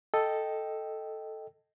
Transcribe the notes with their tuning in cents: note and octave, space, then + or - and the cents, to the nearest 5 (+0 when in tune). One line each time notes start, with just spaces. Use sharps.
A4 +0 D#5 +0 G5 +0